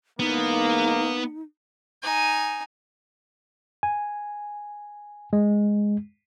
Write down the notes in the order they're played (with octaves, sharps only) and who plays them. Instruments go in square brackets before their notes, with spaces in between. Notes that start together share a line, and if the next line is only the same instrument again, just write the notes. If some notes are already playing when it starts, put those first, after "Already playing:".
[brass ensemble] E2 G#2 A#3 [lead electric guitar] B3 [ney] D#4
[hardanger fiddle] D#4 G#5
[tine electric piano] G#5
G#3